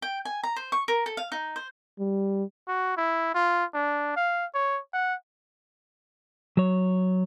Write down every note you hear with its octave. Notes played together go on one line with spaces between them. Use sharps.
G5
G#5
A#5
C5
C#6
A#4
A4
F5
D#4
C5
G3
F#4
E4
F4
D4
F5
C#5
F#5
F#3 C#5